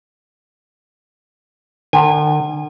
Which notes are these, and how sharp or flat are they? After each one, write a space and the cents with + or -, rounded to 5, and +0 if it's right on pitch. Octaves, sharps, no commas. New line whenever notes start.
D3 +45 G#5 -30